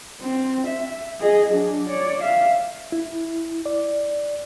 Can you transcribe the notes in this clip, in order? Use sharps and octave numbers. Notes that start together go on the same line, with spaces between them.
C4
E5
G#4 D#5
F#3 D4
C#5 D5
E5 F5
E4
D5